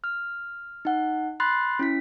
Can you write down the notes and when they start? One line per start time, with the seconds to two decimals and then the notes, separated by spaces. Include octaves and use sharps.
0.04 F6
0.85 D#4 F#5
1.40 B5 C6 F#6 A6 C7
1.79 C#4 E4 B6